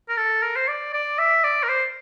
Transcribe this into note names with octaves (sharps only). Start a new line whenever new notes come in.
A#4
A4
A#4
C5
D5
D5
E5
D5
A#4
C5